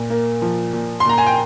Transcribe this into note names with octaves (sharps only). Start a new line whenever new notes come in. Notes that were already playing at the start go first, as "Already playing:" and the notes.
Already playing: A#2
A#3
F3
A#2
C6
A#2 A#5
G#5
G5